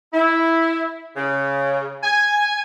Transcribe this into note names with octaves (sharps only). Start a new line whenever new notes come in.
E4
C#3
G#5